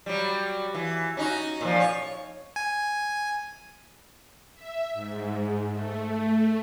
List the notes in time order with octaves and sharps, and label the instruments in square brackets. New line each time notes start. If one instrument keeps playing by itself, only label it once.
[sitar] F#3 G3
E3
C#4 D#4 F#4
A#2 D3 F3
C#5
[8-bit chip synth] G#5
[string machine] E5
G#2
A3
A3